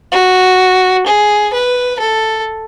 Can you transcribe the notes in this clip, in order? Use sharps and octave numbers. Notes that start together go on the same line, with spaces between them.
F#4
G#4
B4
A4